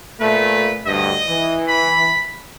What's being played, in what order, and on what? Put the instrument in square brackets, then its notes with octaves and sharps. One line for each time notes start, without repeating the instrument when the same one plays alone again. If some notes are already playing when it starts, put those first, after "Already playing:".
[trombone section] A#2 A3 [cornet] B4
[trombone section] D2 G2 [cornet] D#5
[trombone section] E3
[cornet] B5